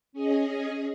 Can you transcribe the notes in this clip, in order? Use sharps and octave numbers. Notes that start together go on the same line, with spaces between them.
C#4 G#4 D#5